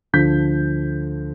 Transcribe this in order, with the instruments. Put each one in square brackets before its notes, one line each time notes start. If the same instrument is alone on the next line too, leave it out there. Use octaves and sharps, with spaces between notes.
[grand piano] D2 D3 F3 G6 B6